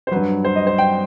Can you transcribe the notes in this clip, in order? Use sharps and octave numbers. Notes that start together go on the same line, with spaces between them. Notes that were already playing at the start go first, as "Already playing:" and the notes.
C5
G2 F#3 B4
C5
D#5
C5
G5